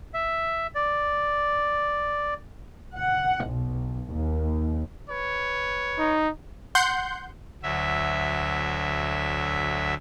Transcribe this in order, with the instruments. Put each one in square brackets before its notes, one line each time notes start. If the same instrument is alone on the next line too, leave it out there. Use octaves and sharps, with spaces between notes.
[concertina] E5
D5
[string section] F#5
B1
D#2
[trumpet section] B4 C#5
[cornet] D#4
[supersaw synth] F#5 C6 G6
[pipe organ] D2 F#3 E5